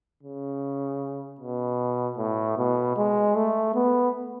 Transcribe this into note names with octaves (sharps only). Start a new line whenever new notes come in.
C#3
B2
A2
B2
G#3
A3
B3